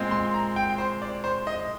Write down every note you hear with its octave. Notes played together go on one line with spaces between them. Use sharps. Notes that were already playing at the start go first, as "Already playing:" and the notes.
Already playing: A#2 G#3 C4
C6
A#5
G5
C5
D5
C5
D#5